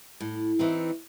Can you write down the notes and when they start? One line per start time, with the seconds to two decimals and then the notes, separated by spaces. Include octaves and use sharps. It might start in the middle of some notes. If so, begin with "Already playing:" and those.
0.20 A2
0.59 E3 C4 D#4